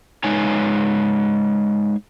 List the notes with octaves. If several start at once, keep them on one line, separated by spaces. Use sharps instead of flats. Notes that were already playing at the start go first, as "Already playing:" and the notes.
G#3 D#4 B4 C#5 F5 G#5